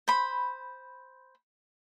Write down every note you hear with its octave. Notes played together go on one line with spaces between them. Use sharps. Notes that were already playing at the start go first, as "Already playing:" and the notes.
C5 B5